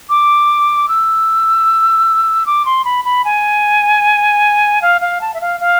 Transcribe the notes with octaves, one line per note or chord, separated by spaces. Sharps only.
D6
E6
D6
C6
B5
B5
G#5
F5
F5
A5
E5
F5
F5